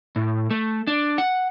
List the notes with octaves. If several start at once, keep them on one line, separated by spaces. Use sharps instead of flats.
A2
A3
D4
F#5